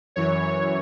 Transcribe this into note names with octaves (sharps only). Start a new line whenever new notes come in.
F#2 E3 C#5